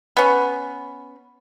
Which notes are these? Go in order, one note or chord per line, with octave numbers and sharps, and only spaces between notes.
B3 C#4